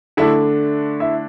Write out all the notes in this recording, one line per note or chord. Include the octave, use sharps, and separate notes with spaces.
D3 A3 D4 E4 E5
E4 E5